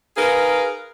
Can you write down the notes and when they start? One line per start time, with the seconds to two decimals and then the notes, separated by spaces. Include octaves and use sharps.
0.17 D#4 G#4 A#4 B4 F5